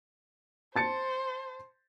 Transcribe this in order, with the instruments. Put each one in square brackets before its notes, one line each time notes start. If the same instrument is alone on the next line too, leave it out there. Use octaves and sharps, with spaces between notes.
[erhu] C5 [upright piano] A5 A6 C#7